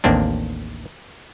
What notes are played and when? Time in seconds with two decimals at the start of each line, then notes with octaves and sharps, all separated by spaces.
0.04 A1 D#2 A#3 C4 D4